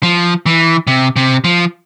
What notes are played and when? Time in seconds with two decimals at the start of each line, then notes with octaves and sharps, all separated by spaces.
0.03 F3
0.46 E3
0.87 C3
1.16 C3
1.44 F3